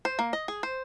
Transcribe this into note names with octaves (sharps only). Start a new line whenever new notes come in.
C5
A#3
D#5
G#4
C5